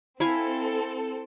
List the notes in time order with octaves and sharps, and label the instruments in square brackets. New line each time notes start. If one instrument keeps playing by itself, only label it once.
[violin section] C4 A4 [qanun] E4 F5 G#5